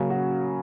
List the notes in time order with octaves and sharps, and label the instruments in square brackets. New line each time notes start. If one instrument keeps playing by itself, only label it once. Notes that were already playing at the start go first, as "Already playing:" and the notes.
Already playing: [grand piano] C#3 F#3 F#4 [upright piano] A#3 C#4
[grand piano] F#4